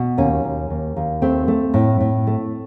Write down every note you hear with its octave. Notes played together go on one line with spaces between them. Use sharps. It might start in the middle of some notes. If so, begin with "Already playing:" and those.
Already playing: B2
D#2 C#4
D#2
D#2
D#2
A3 C4
A3
A2
A2
A3